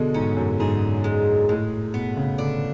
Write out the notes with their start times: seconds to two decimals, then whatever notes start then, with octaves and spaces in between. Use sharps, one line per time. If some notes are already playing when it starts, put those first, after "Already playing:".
Already playing: B2 D3 G#3
0.14 G#2 C#4
0.37 F#2
0.60 G#2 G#4
1.04 G#3
1.49 A2 G#3
1.94 B2 B3
2.17 C#3
2.38 D3 D4